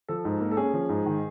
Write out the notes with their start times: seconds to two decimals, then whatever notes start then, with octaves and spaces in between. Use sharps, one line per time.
0.08 F3 A4
0.25 G#2
0.41 A#3
0.51 A4
0.57 C#4 G#4
0.74 F3
0.89 G#2
1.06 D#3